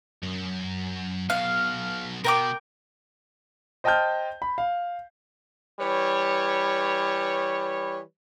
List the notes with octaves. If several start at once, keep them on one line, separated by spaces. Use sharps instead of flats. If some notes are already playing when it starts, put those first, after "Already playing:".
F#2
B1 B2 F5
B2 A#4 G5 D6
C5 D#5 G5 A5 F6 G6
B5
F5
E3 G3 B4 C#5